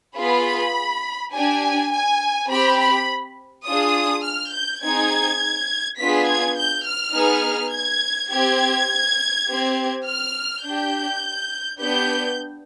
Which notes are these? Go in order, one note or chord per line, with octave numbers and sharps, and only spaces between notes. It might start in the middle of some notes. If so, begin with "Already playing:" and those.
B3 F4 G#4 B5
D4 G4 G#5
G#5
C4 G4 B5
B5
D4 F4 G#4 D#6
F6
G6
C4 D#4 G#4 G#6
B3 D4 F4 G#4 B6
G#6
G6
F6
B3 D#4 G#4
G#6
C4 G4 G#6
C4 G4
F6
D4 G4 G6
B3 D4 G4 G6